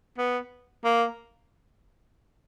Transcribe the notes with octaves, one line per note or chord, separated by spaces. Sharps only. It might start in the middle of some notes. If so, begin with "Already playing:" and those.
B3
A#3